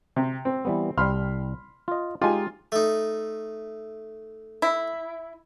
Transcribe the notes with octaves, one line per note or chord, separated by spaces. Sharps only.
C3
C4
E3 G3 B3
C2 G3 B5 C6 F6
F4 D#5
G#3 D#4 F4 G4 G#5
A3 D#4
E4